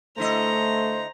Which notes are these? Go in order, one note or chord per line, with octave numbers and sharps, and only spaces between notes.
D3 A3 E4 C5 D#5 A#5